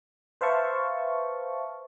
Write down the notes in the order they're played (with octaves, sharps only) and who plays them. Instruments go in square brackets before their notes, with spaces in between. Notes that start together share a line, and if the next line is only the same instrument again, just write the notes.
[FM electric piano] B4 C5 E5 F5 A5 C#6